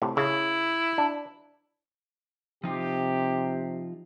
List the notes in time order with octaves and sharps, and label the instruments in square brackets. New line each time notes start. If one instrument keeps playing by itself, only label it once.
[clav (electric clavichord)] A2 C3
[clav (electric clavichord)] C#3 [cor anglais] E4
[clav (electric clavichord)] D4
[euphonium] C3 [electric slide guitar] F3 D#4 F4 [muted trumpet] G4